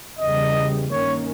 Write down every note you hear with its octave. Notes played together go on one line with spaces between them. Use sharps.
E2 C#3 E3 G3 D#5
G2 D#3 A#3 C#4 C#5